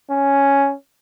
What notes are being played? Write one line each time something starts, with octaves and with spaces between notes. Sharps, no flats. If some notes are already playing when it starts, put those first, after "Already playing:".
C#4